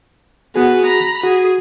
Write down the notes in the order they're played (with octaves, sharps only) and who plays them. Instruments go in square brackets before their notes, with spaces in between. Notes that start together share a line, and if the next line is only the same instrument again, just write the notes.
[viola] B3 [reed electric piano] F#4 G#4
[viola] A#5 B5
[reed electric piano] F#4 [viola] G#4